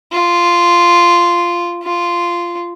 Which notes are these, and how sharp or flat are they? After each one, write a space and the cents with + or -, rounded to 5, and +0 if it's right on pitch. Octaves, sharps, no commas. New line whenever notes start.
F4 -10
F4 -10